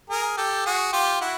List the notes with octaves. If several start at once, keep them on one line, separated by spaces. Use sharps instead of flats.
G#4 A#4
G4 A4
F#4 G#4
F4 G4
E4 F#4